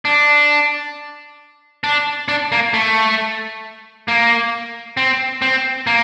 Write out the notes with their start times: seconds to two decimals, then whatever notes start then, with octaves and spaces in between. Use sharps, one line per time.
0.05 D4
1.84 D4
2.28 D4
2.52 A#3
2.74 A3
4.08 A#3
4.97 C4
5.42 C4
5.87 A#3